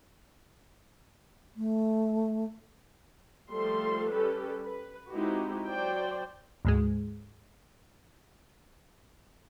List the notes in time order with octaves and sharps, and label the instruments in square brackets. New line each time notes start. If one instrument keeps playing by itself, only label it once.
[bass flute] A3
[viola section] F3 G3 A3 A4 C6
G3 C#4 G4 A4 B4
B4
G#3 C4 D#4 E4 F#4 G4
F#3 C5 D5 G5
[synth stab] D2 G#2 G#3